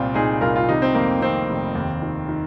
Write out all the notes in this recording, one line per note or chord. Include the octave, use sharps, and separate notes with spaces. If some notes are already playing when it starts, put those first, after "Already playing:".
Already playing: C2 A#2 C4 F4
A#2 D#4 G#4
C2 F4 A#4
F4
C3 D#4
C4
F2 A#3
D#3 C4
F1
D#2
D#3
D#3